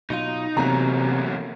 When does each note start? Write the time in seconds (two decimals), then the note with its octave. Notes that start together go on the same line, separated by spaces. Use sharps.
0.10 B2 F#3 D#4 F4
0.57 E2 C3 F#3 A3 A#3 C#4 A#5